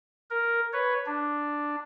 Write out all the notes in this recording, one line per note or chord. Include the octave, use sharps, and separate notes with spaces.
A#4
B4 C#5
D4